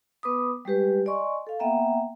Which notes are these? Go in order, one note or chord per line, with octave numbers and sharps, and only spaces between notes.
B3 B4 B5 D6 D#6
G3 G#3 G4 B4
D5 D#5 G#5 C6 C#6
A4 F5
A#3 B3 E5 F#5 G5 A#5